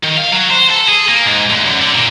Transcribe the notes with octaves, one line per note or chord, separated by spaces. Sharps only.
D#3
F5
F#3
C5
A4
G#4
A#3
G#2
D2
F#2
D3
A#2